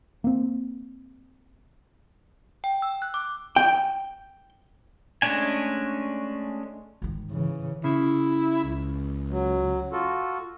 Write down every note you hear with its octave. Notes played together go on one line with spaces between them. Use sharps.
A#3 C4
G5
E6
F#6
D6
G5
G#3 A3 C#4 D4 G#5
G#2 D#3
C#3 E3
C#3 E4
C#2
F#3
F4 F#4 A4